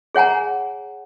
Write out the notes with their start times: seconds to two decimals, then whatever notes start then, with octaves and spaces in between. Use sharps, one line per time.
0.15 G#4 C#5 F#5 G#5 A#5